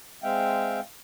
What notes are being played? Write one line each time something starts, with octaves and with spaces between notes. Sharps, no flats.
G#3 C4 E5 F5 G5